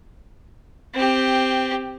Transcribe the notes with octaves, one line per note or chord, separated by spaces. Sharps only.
C4 G4